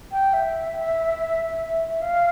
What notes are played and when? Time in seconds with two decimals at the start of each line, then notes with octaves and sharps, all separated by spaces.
0.12 G5
0.33 E5
2.01 F5